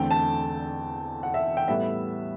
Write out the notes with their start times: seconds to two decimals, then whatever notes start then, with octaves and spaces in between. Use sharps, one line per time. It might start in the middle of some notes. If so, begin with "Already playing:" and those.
Already playing: E2 D3 A3 C4 G5
0.11 A5
1.23 F#5
1.34 E5
1.57 G5
1.68 A2 G3 B3 E5